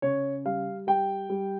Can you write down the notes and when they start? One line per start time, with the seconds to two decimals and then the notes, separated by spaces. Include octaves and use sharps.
0.02 C#3 C#5
0.45 G3 F5
0.87 G3 G5
1.30 G3